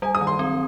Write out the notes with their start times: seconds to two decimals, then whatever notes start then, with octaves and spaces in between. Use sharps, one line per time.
0.02 G3 G#5
0.15 D#6
0.21 D#3
0.27 C6
0.39 C4